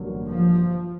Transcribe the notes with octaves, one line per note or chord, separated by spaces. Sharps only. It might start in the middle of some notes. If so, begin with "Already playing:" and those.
Already playing: A1 G2 D3 F#3 A#3
F3